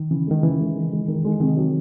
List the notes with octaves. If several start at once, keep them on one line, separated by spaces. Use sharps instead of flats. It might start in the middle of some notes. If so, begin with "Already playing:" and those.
Already playing: D#3
C#3 E3
D#3 G#3
C#3 E3
G#3
D#3
G#3
D#3
G#3
C3 D#3
F#3